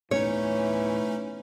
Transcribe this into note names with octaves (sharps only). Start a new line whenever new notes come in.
D1 B2 E3 A3 C#4 D#4 C#5